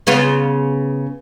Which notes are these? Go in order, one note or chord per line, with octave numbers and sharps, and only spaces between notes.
C#3 B3 F4